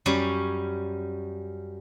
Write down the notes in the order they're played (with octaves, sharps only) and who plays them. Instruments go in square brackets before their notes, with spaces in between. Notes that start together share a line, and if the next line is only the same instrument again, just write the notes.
[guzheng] F#2 G3 C#4